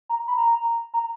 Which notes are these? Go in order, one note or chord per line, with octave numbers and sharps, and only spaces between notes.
A#5
B5
A#5
A#5